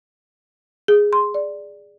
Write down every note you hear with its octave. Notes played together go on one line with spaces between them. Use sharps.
G#4
C6
D5